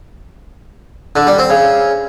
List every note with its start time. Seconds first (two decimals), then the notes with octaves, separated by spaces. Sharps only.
1.16 D3
1.27 G3
1.38 C4
1.50 C#3